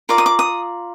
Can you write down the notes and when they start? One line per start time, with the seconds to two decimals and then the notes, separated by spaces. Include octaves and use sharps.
0.09 F4 A#4 D5 D6
0.18 D#6
0.26 D6
0.39 D#6